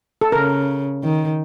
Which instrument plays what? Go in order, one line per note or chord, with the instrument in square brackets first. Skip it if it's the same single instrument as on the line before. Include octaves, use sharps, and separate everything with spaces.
[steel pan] A4
[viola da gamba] C#3 [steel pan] A#4
[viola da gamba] D#3